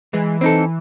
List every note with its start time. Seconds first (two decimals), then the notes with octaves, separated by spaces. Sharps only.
0.13 E3 G#3
0.41 C4 D#4 A4